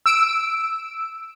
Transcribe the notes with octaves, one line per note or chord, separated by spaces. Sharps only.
E6 D7